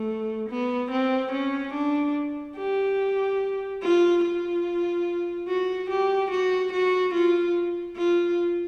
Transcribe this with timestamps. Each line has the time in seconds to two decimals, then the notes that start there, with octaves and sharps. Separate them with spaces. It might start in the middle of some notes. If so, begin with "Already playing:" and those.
Already playing: A3
0.49 B3
0.91 C4
1.32 C#4
1.74 D4
2.57 G4
3.82 F4
4.24 F4
5.48 F#4
5.90 G4
6.31 F#4
6.73 F#4
7.14 F4
7.97 F4